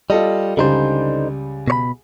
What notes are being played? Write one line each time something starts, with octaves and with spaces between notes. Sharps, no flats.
G3 F4 A4 D#5
C#2 D3 G3 D#4 C5
B2 C#5 B5